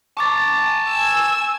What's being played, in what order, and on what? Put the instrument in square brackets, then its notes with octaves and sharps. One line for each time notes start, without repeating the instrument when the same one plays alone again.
[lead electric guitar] A5 A#5 [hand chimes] C#6 D6 A6
[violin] G#5 E6